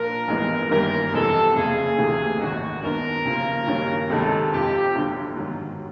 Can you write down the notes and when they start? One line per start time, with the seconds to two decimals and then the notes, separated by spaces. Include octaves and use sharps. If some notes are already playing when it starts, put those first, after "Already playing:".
Already playing: A#2 F3 A#3 D4 A#4
0.28 A1 G2 E3 G#3 B3
0.71 G1 F#2 D#3 G3 A#3 A#4
1.13 F2 C3 E3 G#3 A4
1.55 F#1 F2 C#3 G#4
1.98 D2 C3 E3 A3
2.40 G#1 F#2 D#3 G#3 F#4
2.82 F#2 D#3 G#3 B3 D4 A#4
3.25 D#2 C#3 F3
3.67 G2 D#3 F#3 A#3 C#4
4.10 C#2 C3 D#3 G#3 A4
4.52 F2 C3 F3 G4
4.95 G1 G2 D3 F#3
5.37 G#2 D#3 F#3